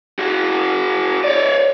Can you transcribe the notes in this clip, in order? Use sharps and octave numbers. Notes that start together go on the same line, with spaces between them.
F#4 G#4
C#5 D5